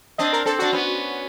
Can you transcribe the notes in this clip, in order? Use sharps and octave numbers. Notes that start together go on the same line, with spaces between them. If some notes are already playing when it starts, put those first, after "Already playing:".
C4 D4 D#5
A#4
C4 D4 A4
D4 F#4
B3 C#4